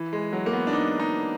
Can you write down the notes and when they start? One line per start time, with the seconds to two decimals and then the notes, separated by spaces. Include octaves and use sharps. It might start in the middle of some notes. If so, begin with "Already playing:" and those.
Already playing: E3
0.13 G#3
0.33 F#3
0.46 A#3
0.53 B3
0.67 D4
0.73 D#4
1.00 D#4